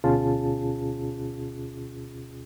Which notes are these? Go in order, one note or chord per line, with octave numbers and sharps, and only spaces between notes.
D2 B2 C#4 F4 G#4 A5